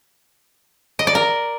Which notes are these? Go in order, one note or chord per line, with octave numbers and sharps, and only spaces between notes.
D#5
D5
A#4